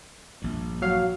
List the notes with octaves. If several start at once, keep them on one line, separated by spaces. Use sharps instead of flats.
A#1 G2
F#3 F5